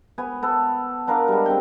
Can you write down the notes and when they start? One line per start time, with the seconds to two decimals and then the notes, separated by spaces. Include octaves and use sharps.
0.18 B3 G#5
0.43 B3 A4
1.07 B3 D4 A#4 F5
1.28 G3 G#3
1.46 C4 D4 G5